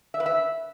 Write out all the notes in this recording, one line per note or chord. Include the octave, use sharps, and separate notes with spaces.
E5
B4
E5